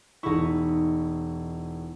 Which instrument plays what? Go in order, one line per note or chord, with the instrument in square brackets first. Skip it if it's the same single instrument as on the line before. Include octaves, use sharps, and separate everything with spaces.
[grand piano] E1 C#6 [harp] D#4 E4